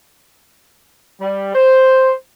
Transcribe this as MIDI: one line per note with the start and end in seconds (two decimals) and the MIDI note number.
1.21 1.53 55
1.55 2.12 72